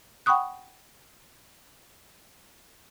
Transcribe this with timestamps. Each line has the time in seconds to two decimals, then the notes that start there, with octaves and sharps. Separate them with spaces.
0.26 F#5 G5 B5 C#6 D#6 F#6